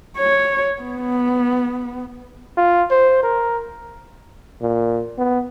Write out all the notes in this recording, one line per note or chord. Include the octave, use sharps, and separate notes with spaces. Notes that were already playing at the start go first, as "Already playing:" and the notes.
C#5
B3
F4
C5
A#4
A#2
B3